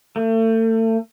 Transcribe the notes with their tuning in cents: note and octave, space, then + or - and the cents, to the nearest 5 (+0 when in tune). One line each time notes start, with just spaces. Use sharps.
A3 +35